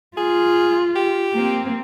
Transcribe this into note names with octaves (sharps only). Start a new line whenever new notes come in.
F4 G#4
G4
A#3 C4